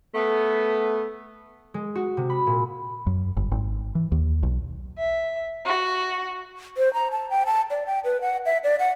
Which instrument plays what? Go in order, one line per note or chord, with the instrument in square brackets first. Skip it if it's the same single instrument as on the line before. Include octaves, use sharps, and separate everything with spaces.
[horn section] A3 B3
[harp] G#3
F#4
C3
B5
A#2
[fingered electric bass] F#2
G1
G#1
E3
D#2
B1
[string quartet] E5
F#4
[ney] C5
A#5
A5
G5
A5
D5
G5
B4
F#5
E5
D5
F#5